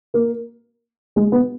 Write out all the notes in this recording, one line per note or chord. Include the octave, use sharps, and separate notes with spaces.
A#3
G#3
B3